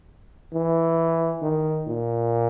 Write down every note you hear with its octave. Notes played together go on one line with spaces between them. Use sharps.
E3
D#3
A#2